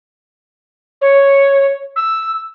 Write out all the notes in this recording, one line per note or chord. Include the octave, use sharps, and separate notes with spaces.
C#5
E6